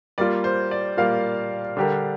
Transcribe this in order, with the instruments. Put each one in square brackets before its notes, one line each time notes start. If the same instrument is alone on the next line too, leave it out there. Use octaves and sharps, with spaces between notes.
[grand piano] G3 A#3 F4 [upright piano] D5
[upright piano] C5
D5
[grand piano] G3 A#3 F4 [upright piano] F5
[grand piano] D3 G3 D4 G4 A#4